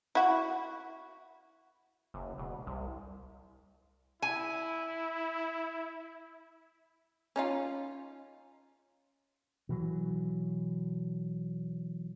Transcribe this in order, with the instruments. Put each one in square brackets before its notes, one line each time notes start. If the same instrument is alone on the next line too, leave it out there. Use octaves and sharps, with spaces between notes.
[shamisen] E4 F#4
[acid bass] F#1
E1
C2
[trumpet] E4 [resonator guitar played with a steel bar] G#5
[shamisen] C#4 D#4 F4
[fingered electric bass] B2 E3 F#3